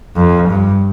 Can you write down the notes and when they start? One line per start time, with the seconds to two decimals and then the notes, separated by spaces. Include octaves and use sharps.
0.16 F2
0.49 G2